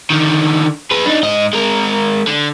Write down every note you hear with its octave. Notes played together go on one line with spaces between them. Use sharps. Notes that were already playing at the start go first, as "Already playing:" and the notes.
D3 D#3
G#4 B4
D4 D#4
G#2 D#5
G#3 A#4
D3